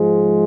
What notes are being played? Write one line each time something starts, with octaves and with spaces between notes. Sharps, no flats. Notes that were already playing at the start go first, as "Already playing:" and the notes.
Already playing: G#2 F3 G#3